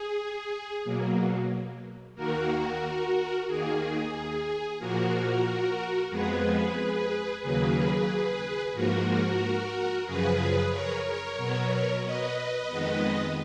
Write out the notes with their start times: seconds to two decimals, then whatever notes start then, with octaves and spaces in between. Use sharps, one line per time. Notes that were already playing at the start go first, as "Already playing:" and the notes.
Already playing: G#4
0.84 B2 F#3 A#3
2.15 D#2 D#3 A#3 F#4 A#4
3.47 D#2 D#3 A#3 G#4
4.79 A#2 F3 A#3 F#4 A#4
6.10 F2 F3 G#3 B3 G#4 B4
7.42 D#2 C#3 F#3 A#3 G#4 B4
8.73 G#2 F3 A#3 F#4 A#4
10.05 F#2 C#3 F3 G#4 B4
10.71 A#4 C#5
11.04 A#4 C#5
11.36 B2 F#3 B3
12.02 B4 D#5
12.68 F2 D#3 G#3 B3